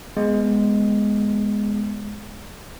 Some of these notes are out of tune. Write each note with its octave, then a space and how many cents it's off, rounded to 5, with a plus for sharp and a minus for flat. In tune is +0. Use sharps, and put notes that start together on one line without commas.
G#3 +0 B3 +0